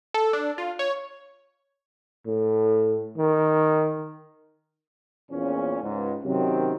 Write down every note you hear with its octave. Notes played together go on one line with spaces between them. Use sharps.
A4
D4
F4
C#5
A2
D#3
A#1 E2 A#2 C#4
C#2 G#2
F#2 C3 D#3 F#3 C4